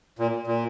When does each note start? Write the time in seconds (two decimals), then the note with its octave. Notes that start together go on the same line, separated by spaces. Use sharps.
0.19 A#2
0.47 A#2